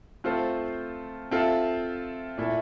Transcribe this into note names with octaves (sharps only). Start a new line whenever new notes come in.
A3 C4 F4 A4 C5
C4 F4 A4 E5
A#2 A3 E4 A4